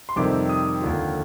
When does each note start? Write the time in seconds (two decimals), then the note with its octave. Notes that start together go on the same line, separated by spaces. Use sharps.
0.09 C6
0.16 F2 C3 D#3 G3 C4 D6
0.49 D#6
0.82 D#2 D3 F3